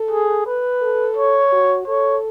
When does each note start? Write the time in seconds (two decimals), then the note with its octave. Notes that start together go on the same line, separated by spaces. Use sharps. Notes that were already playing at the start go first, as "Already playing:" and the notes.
Already playing: A4
0.11 G#4
0.46 B4
0.82 A4
1.16 C#5
1.52 F#4
1.87 A4 C#5